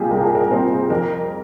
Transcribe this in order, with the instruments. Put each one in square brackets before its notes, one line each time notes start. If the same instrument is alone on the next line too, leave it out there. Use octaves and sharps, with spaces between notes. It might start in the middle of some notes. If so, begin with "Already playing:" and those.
Already playing: [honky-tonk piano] C2 A#2 G3 C4 F4 G4 G#4
C2 A#4
G#4
A#4
A#2 G3 C4 C5
F2 A#4